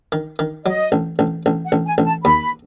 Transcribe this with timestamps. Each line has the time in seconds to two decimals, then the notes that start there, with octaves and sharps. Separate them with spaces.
0.12 D#3
0.39 D#3
0.65 F#3 D#5
0.92 A1
1.19 A1
1.46 A1
1.65 F#5
1.72 A1
1.85 G#5
1.98 A1
2.05 A5
2.25 D#2 B5